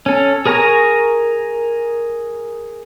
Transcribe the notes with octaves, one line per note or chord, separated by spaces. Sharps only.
C#4 A4
G#4 A#4 G#5 A#5 C#6